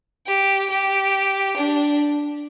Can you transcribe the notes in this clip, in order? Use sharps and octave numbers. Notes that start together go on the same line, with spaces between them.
G4
G4
D4